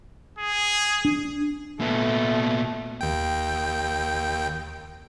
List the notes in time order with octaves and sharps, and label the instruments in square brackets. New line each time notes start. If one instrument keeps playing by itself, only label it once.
[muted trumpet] G#4
[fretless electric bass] D4
[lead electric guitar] A#2 B3 [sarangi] A3
[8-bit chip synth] D#2 G5